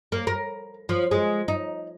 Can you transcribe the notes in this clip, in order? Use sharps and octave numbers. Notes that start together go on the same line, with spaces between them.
A#3
A#4
F3
G#3
D#4